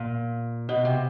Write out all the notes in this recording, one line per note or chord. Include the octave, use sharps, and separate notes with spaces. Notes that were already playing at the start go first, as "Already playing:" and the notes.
Already playing: A#2
B2
C3